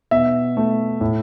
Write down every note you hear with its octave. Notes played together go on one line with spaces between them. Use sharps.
B2 E5
A3
A2